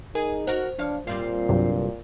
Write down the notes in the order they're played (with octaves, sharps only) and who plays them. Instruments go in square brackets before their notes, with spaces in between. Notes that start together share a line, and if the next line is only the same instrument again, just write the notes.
[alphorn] D#4 [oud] G#4 [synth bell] A#4 G#5
[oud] F#4 A#4 [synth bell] C5
[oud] F3 C#5 F5 [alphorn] D4
[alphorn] A#2 [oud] G3 C4 F4
[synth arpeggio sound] C2 G2 F#3